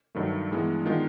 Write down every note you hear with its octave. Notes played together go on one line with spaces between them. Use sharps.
G2 D#3 F#3 A3
G2 E3 G#3 B3
D#3 G#3 B3 D4 F4